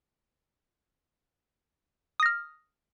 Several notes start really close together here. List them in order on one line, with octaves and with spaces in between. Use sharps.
D#6 A#6 F6